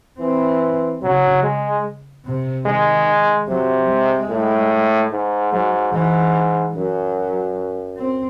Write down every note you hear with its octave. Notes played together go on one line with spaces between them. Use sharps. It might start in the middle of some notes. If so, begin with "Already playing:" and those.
E3 C4
C#3 F#3
G#3
C3
D#3 G#3
C3 F#3
G#3
A2
G#2
G#2 F#3
G#2 E3
F#2 F#3
C4